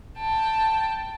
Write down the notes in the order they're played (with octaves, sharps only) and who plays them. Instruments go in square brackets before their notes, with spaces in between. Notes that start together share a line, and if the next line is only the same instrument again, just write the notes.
[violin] G5 A5